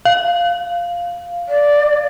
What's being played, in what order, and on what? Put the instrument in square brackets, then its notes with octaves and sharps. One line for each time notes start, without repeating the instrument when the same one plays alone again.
[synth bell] F5
[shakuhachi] D5